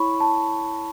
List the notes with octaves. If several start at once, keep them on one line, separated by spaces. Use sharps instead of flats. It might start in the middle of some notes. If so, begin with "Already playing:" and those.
Already playing: E4 C#5 B5 C#6
A5